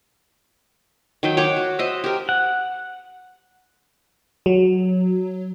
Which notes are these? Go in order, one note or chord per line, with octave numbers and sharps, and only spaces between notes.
D#3 F#3 G5
C#5 F#5 G5 D6
F#4
C5 D#5 E5
G4 A#4
F#5
F#3